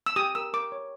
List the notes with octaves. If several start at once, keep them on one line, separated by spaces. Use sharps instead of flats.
E6
G4 D#6
A#4 E6
A#4 D6
C#5